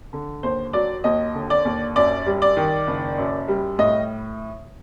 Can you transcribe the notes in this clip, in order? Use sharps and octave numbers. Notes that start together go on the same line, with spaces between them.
D3
D#2 C5
F#3 D5
D#2 D#5
D3
D5
D#2
F#2 D5
G3
D5
D#3
F#1
F#2
G3
A2 D#5